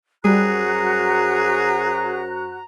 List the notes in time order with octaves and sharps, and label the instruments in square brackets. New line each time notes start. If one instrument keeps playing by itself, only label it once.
[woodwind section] F#2 C5 A#5 [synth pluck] G3 [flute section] F#4 F#6 [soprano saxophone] G#4